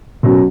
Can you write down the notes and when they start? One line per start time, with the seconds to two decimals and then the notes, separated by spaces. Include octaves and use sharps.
0.23 B2 F#3 C#4